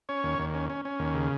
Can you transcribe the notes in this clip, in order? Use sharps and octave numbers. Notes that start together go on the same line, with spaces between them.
C#4 C#5
D#2
D#2
C#4
C#4
C#4
D#2
C#3